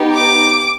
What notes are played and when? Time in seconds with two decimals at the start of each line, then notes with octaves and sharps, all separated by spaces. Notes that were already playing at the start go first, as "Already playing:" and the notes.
Already playing: B3 D#4 G4
0.14 D6